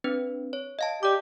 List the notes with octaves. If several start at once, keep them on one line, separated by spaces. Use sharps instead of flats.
C4 D4 B4
C#5
D#5 F5 A5
G4 D5 D6